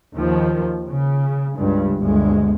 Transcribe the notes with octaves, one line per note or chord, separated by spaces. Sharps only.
D#2 D#3 F3
C#3
C#2 G2
G1 D2 G#3